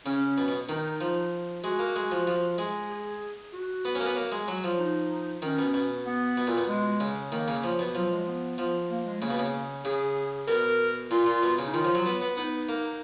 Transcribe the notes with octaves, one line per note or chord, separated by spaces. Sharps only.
C#3 C#4
B2
B2
D#3 D#4
F3
G#3 F#4
A#3
G#3
F3
F3
G#3
G#4
F#4
B3
C#4
A#3
B3
A#3
G#3
F#3
F3
D#4
D#3 C#4
B2
B2
B3
B2
A#2
B2
G#3
C#3
D#3 A#3
C#3
F3
B2
F3 F#3
G#3
B3
F3
A#3
G#3
C#3 A#3
B2
C#3
C#3 G#4
B2 A#4
A#2 F4
A#2
B2
C#3
D#4
D#3 F4
F3
F#3
B3
B3
B3 D#4
A#3